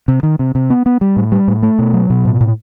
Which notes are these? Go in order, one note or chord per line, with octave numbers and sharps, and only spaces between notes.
C3
D#3
C3
C3
B3
B3
G3
A2
G3
A2
A3
B2
F#3
B2
A2
A2